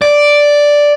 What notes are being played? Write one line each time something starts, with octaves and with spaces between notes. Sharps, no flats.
D5